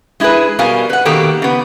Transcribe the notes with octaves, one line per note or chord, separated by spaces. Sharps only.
G#3 E4 G4 G#4 B4
B2 G3 A#4 F5 G#5 A5
B4 F#5
B2 D#3 A#3 G4 A4
C#3 B3